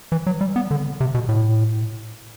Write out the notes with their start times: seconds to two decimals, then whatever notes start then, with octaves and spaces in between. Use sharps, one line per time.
0.12 E3
0.27 F#3
0.41 G3
0.56 B3
0.71 D3
1.00 C3
1.15 B2
1.29 A2